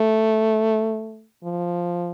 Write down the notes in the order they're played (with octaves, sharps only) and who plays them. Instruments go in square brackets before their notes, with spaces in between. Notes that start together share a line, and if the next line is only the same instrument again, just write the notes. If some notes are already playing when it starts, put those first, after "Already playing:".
Already playing: [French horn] A3
F3